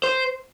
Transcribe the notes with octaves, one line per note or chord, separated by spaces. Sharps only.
C5